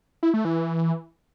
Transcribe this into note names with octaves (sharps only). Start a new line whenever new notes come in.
E4
A3
E3